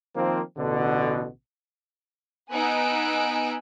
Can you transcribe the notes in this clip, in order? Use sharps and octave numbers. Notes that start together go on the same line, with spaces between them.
D#3 F3 A#3 C4
A1 B2 D3
B3 D#4 G#5 E6 F#6 D7